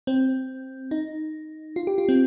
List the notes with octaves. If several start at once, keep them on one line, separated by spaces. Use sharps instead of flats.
C4
D#4
F4
G4
F4
C4